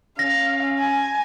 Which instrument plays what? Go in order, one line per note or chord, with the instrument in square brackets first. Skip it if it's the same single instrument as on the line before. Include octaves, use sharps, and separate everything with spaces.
[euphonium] C#4 [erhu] F5 [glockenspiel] A#6
[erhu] G#5